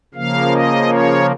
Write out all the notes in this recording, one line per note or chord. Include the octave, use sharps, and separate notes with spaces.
C#3 F3 A#3 F5
D#5
C#5